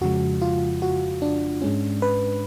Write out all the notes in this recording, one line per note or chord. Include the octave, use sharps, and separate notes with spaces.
F2 C#3 F3 G#3 F#4
F4
F#4
D4
G#2 G#3 C#4
B4